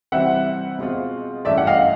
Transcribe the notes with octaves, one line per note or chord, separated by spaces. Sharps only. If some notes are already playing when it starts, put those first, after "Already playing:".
C3 E3 G3 C4 E5 F#5
B2 G#3 C4 F4
G2 E3 A3 C#4 D5 E5
F#5
D#5 F5